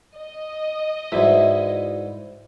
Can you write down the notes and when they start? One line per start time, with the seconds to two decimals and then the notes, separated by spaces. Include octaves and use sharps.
0.16 D#5
1.12 G#2 E3 E4 F#4 D5 E5